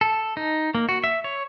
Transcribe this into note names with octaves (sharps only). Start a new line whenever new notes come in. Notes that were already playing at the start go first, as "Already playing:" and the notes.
A4
D#4
A#3
F#4
E5
C#5